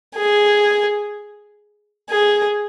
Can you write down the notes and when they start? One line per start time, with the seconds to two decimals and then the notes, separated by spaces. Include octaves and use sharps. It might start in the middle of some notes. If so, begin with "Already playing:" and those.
0.16 G#4
2.10 G#4